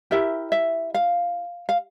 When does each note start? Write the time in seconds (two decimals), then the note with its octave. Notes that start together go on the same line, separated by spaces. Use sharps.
0.11 E4 G4 A#4 E5
0.52 E5
0.94 F5
1.69 F5